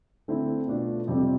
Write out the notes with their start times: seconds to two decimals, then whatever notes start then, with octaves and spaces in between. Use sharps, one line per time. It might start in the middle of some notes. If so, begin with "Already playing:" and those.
0.28 D3 A3 C4 E4
0.68 B2 A3 D4 F4
1.07 F2 C3 G3 C4